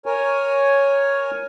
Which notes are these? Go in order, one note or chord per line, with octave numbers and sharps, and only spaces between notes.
A#4 C#5 G#5